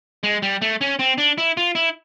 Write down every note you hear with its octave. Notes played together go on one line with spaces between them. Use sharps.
G#3
G3
A3
C#4
C4
D4
E4
F4
E4